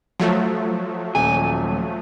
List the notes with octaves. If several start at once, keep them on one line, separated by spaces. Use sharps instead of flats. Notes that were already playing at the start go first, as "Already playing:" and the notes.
F3 F#3 A3
D#1 G#5